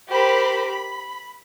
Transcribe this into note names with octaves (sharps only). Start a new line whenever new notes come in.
G4 A#4 C5 B5
B5